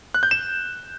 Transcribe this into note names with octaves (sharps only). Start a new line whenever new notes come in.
F#6
G6
E7